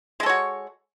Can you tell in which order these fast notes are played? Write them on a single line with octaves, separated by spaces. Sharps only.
G#3 A4 C#5 F#4